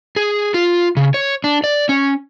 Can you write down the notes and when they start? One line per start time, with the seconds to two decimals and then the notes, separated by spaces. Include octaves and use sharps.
0.16 G#4
0.54 F4
0.97 C#3
1.14 C#5
1.44 D4
1.64 D5
1.89 C#4